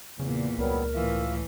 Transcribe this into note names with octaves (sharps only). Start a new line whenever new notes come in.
E2 A#2 C#3
C#2 F#3 G3 B3 A#4
A2 E3 F4 E5